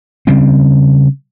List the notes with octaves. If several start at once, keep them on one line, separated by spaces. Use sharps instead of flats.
C#3 G3 C4